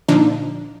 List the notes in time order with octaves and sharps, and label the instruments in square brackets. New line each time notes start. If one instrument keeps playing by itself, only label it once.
[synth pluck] A#2 D3 F3 D4 D#4